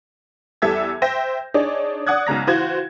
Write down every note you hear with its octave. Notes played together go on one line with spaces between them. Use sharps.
E2 G3 A4 E5 E6 G#6
C5 E5 G5 G6 A#6
D4 D#4 G#4 C#5 D5
D5 F#5 D#6 F#6 G#6
B1 G#2 C#3 A#5 A#6
E3 F4 F#4 C5 G#6